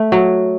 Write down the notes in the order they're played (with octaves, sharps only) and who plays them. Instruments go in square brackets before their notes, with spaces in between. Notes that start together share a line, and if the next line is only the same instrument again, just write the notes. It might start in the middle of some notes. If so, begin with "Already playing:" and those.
Already playing: [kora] A3
F#3